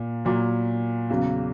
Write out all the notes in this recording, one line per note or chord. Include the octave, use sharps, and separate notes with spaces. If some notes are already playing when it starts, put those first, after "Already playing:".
Already playing: A#2
A#2 F#3
E2 C#3 F#3